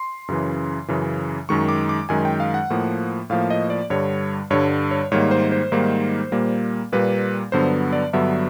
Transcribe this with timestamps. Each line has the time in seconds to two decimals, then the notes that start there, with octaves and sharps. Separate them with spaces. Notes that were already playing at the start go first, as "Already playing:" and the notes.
Already playing: C6
0.28 F#2 C#3 E3
0.88 F#2 C#3 E3
1.49 F#2 D#3 G#3 C#6
1.69 D6
1.89 D6
2.09 F#2 D#3 G#3 G#5
2.25 G5
2.40 F5
2.54 F#5
2.70 A2 F3 A#3
3.30 A2 F3 A#3 F5
3.50 D#5
3.70 D5
3.90 G2 D3 G3 C#5
4.51 G2 D3 G3 C#5
4.91 C#5
5.12 G#2 D#3 G3 A#3 C#5
5.31 C5
5.52 C5
5.72 G#2 D#3 G3 A#3
6.32 A#2 G3 A#3
6.92 A#2 G3 A#3 B4
7.52 G2 D3 F#3 B3 C5
7.93 D5
8.13 G2 D3 F#3 B3 E5